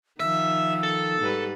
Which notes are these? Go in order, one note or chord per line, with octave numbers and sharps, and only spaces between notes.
D#3 F3 E5 E6
A4
G#2 G3 B4